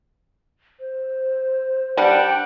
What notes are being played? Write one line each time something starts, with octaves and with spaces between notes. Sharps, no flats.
C5
G3 D4 F#5 G5